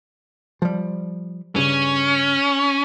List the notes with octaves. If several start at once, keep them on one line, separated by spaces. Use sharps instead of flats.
F3 G3
G2 C#3 C#4